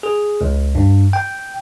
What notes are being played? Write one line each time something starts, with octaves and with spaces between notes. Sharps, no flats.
G#4
C#2
G2
G5